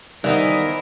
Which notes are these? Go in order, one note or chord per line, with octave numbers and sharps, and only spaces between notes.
D#3 E3 G3 B3 D#4 A#4 C5 D5